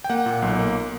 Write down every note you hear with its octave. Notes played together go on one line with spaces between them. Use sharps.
G5
A#3 F#5
A#2
B1
A#3